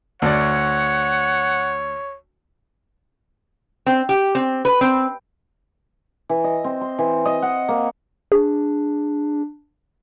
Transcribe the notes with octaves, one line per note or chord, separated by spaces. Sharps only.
D2 C#5 D5 F#5
C4
G4
C4
B4
C4
E3
D#5
C4
C6
E3
D#5
F#5
A#3
D4 G#4